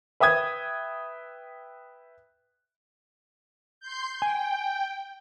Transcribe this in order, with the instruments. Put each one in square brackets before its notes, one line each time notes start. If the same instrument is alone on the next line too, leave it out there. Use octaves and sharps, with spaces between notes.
[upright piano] B4 E5 G5 D#6 G#6
[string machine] C6 G6
[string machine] G5 [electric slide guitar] G#5